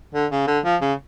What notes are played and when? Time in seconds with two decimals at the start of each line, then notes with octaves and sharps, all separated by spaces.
0.15 D3
0.31 C#3
0.47 D3
0.64 F3
0.81 C#3